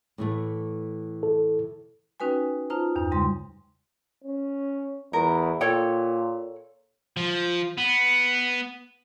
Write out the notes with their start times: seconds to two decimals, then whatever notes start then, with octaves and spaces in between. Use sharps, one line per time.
0.18 A2 E3 A3
1.23 A4
2.20 C#4 D#4 F#4 B4 G5 G#5
2.70 D#4 F4 C5 A5 A#5
2.96 E2 G2 D#4
3.11 C#3 G3 G#3 C6
4.24 C#4
5.13 E2 A#4
5.61 A#2 A4 C#5 G5
7.17 F3
7.77 B3